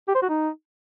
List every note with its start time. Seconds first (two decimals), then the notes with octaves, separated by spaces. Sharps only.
0.08 G4
0.15 C5
0.22 F#4
0.29 D#4